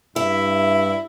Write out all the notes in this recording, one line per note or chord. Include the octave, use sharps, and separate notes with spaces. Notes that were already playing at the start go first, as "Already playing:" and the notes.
G2 E4 E5